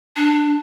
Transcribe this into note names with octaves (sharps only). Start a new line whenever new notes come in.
D4